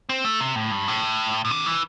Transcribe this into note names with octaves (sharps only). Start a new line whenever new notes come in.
C4
A3
C3
A2
G2
A2
A2
C3
E3